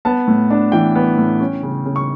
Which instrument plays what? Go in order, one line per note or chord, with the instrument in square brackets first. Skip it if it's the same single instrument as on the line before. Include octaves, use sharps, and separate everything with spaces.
[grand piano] B3 A5
A2
D4
E3 G5
B3
A2
C#4
C#3
C#3
C#6